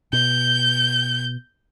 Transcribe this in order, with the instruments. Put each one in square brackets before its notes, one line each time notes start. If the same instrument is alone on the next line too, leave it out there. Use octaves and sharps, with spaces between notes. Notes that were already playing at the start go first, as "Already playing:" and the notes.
[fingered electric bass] B2 [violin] G6